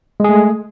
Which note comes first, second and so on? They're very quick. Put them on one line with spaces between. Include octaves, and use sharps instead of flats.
G#3 G#4 A3